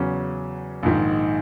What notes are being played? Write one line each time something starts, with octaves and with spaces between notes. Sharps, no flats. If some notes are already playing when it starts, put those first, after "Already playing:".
Already playing: E2 C#3 F#3 C#4
A#1 G#2 D#3